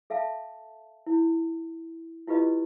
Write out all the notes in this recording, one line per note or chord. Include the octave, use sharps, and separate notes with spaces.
A4 E5 F5 A5
E4
E4 F4 G4 B4 D#5